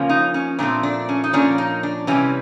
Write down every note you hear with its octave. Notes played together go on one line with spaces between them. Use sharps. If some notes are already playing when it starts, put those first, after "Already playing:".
Already playing: C#3 F3 A#3 C#4
D#4
C#4
A#2 F3 A3 C4 D4
D4
C#4
D#4
A#2 F3 A#3 C#4 D4
D#4
D4
C3 E3 G3 C4 C#4